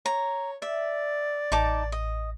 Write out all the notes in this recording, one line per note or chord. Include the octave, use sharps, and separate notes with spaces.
C#5 A#5
D5 E5
A1 D#4 A5 D6
D#5